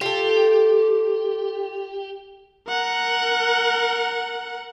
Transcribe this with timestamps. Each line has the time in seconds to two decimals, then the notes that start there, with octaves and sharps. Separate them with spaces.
0.01 F4 G4 A4
2.69 A#4 F#5